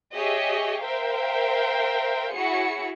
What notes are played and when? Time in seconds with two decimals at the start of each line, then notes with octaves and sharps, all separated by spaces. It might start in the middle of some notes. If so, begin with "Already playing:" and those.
0.14 G4 G#4 C#5 D#5 E5
0.82 A#4 C5 E5 F5 G5
2.32 E4 F#4 G#4 C#5 C#7